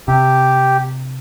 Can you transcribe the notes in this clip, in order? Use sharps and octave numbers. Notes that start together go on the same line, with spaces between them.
C3 G4